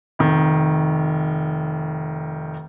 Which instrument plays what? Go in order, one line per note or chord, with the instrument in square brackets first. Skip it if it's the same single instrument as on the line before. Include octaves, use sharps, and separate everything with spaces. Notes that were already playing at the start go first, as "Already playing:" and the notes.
[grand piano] F1 D#3